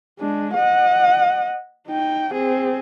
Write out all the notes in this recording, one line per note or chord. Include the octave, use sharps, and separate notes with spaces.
G#3 D4
D#5 F#5
D#4 G5
C4 G#4